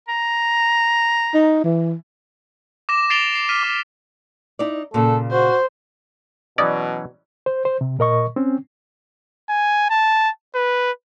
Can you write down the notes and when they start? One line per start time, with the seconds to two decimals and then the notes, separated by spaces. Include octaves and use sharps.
0.09 A#5
1.34 D#4
1.64 E3
2.89 D6 A#6 E7
3.10 A6 C7 D7 E7 F7 G7
3.35 C7
3.49 F6 B6 D#7
3.63 D6
4.59 D#4 E4 D5
4.94 A#2 C#3 A4
5.32 F#4 C5
6.58 B2 E3 F#3 C#4 D5 D#5
7.46 C5
7.65 C5
7.81 C3
7.99 A#2 A#4 D#5 C#6
8.36 C4 C#4
9.49 G#5
9.90 A5
10.55 B4